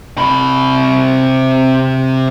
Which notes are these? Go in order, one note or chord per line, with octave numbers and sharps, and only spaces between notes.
C3 B5